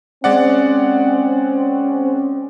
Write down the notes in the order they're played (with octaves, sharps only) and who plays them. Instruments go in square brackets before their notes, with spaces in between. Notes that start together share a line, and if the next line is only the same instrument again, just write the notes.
[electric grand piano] G#3 D5 F#5 [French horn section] C4 C#4